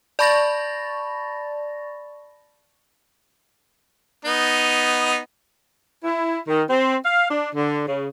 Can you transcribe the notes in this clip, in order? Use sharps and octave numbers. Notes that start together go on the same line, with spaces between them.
D5 A5 B5 C#6 A6 A#6
B3 D#4
E4
D#3
C4
F5
D4
D3
C#3